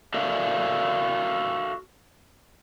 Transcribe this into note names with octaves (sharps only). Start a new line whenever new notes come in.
F#4 A4 A#4 D5 E5 F5